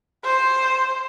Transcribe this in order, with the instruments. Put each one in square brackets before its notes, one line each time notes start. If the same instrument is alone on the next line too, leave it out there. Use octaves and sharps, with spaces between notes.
[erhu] C5